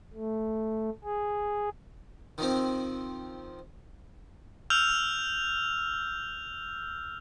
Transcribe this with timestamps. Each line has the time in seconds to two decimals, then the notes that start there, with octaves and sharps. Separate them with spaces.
0.14 A3
1.04 G#4
2.38 D#3 F3 C4
4.70 E6 F6 G6 F7